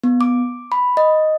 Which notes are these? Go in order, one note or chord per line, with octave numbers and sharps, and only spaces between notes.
B3
D6
B5
D#5